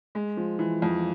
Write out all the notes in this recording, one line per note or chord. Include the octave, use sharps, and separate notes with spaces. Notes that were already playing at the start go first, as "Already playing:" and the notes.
G#3
F3
E3
F2